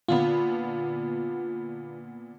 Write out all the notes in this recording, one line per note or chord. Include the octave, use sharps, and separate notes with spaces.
A#2 D3 B3 F4